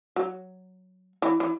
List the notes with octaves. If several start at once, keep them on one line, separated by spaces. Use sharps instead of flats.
F#3
E3
E3